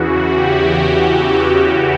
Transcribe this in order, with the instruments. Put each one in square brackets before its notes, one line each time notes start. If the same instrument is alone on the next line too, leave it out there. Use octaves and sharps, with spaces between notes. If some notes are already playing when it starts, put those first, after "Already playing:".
Already playing: [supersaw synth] E2 C#3 E3 F#4
G4